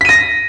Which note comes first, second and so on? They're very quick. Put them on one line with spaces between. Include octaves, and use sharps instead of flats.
B6 D#7 A#6